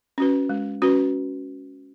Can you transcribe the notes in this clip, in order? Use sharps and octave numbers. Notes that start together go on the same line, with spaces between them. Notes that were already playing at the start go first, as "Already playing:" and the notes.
C#4 F#4 B4
G#3
C#4 F#4 B4